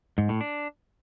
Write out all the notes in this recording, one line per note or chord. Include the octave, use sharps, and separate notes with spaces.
G#2
A2
D4